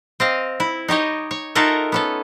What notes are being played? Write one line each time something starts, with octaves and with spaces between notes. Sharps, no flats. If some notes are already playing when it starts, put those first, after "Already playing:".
C4 D#5 F5
E4
D#4 G4 C#5 D#5
C#5
D#4 F4 F#4 A4 A#4 E5
B3 C#4 A4